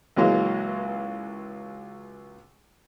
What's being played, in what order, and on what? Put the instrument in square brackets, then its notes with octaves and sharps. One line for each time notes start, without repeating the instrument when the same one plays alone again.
[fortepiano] C#2 E3 F#3 G#3 A#3